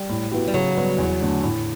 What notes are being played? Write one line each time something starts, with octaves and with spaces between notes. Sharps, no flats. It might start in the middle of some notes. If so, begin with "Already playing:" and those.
Already playing: G3
A2
F#3 B3 E4 G4
G3
C#3 F#3
G3 B3 F#4
E2
D3 A3
A2